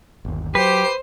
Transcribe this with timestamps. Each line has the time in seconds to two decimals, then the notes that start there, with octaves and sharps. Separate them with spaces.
0.25 G1 D#2
0.55 F#3 G4 B4 C5 C7